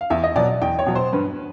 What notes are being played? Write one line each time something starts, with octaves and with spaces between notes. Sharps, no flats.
F5
E2 E5
D#5
B2 F#3 D5
E2 G5
C#5
B2 F#3
C5
G2 B4